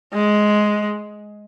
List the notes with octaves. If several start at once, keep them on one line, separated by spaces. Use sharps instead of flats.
G#3